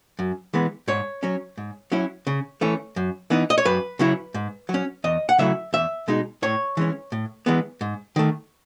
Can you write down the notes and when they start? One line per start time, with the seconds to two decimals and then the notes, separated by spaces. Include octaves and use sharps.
0.19 F#2
0.54 E3 G#3 B3
0.88 G#2 C#5
1.23 F#3 C#4
1.58 G#2
1.92 F#3 C#4 E4
2.27 C#3
2.61 E3 A3 C#4
2.96 F#2
3.30 E3 B3 D#4
3.50 D#5
3.58 C#5
3.65 F#2 B4
3.99 C#3 F#3 C#4 E4
4.34 G#2
4.69 F#3
4.74 C#4
5.04 E2 D#5
5.29 F#5
5.38 C#3 F#3 A3 E4 E5
5.73 E2 E5
6.08 B2 G#3 D#4
6.42 A2 C#5
6.77 E3 G#3 C#4
7.12 A2
7.46 E3 G#3 B3
7.81 G#2
8.16 D#3 A3